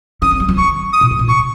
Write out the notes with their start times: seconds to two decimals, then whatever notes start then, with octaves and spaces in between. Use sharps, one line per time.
0.22 C#4 D#6
0.31 C4
0.40 G3
0.49 F3
0.57 D#3 C#6
0.93 D#6
1.01 A#2
1.11 G#2
1.19 A#2
1.28 C3 C#6